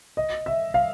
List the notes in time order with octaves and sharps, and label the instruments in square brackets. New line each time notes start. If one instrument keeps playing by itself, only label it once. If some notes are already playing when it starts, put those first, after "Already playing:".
[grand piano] D#5
E5
F5